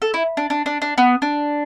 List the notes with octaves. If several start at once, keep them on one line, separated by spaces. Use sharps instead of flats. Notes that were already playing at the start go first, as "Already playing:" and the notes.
A4
E4
D4
D4
D4
D4
B3
D4